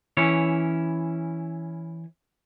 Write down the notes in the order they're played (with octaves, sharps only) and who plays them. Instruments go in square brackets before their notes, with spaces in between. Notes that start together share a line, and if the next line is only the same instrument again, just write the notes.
[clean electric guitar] E3 C#4 E4 C#5